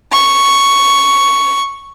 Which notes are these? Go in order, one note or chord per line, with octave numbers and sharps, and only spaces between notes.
C#6